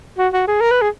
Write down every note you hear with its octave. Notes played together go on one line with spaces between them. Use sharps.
F#4
F#4
G#4
A#4
B4
G#4